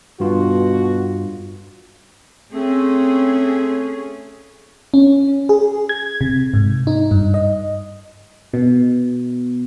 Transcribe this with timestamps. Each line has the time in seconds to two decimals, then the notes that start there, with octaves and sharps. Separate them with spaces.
0.20 G2 B2 F4 F#4
2.52 A3 C4 C#4 G#4
4.94 C#4
5.49 G#4
5.89 G#6
6.21 C3
6.54 G#2
6.87 D#4
7.11 G2
7.34 D#5
8.53 B2